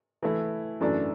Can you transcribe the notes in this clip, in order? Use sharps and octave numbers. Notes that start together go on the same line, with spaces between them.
E3 A3 E4
F#2 E3 A3 D4